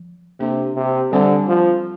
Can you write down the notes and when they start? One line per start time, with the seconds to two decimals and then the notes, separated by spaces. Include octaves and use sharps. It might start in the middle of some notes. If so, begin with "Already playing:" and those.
Already playing: F3
0.40 C3 A#3 D4 A4
0.76 C3
1.12 D3 G3 C4 G4 C5
1.48 F3